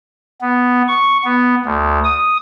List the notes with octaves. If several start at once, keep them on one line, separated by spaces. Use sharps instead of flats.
B3
C#6
B3
D2
D#6